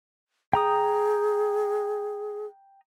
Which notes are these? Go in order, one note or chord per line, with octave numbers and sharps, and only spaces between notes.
G#4 G5 A#5 D#6